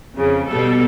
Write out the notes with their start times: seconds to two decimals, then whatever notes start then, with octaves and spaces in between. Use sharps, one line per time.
0.15 F2 C#3
0.48 B2 G3 A4